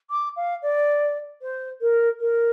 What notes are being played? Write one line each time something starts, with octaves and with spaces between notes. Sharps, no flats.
D6
F5
D5
C5
A#4
A#4